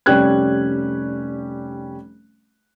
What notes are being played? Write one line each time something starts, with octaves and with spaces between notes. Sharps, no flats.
F1 G3 C#4 G4 F#6 G#6